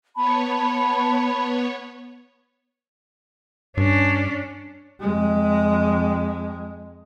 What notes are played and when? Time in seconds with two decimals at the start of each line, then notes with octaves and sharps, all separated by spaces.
0.16 B3 C#5 A5 B5
3.77 G2 C#4 D4
5.00 F2 G#3